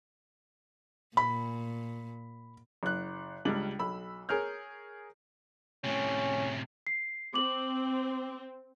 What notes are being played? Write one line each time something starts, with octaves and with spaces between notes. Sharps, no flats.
A#2 B5
F#1 F#6
C#2 G3 D4 F#7
B1 B5 E6
G#4 A#4 C#5 F6 G6
A2 C3 C#4
C7
C4 D6 F#7